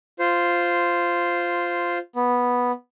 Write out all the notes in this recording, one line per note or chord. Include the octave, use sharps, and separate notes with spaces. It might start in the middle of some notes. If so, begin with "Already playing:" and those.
F4 C5
B3